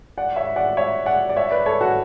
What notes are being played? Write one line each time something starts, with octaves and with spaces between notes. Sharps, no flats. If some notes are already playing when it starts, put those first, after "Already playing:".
D5 F#5
C#5 E5
D5 F#5
C#5 E5
D5 F#5
D5
C#5 E5
B4 D5
A4 C#5
F#4 A4